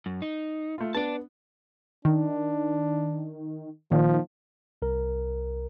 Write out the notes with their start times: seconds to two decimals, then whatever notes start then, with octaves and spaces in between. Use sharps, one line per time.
0.06 F#2
0.22 D#4
0.78 A3 F4
0.95 B3 D4 D5 A5
2.05 D#3 D4
3.92 A#2 D#3 F3
4.82 C2 A#4